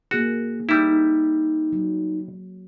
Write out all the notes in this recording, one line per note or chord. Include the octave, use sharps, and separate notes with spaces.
A#3 F#4 G#4
G3 D#4 E4
D#4
F#3